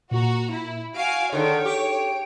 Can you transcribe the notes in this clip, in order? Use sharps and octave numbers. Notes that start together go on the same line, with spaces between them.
A#2 F#4 A#5
E4
F#4 F5 G#5 D7
D3 D#3 G#4 A4 C#5
G4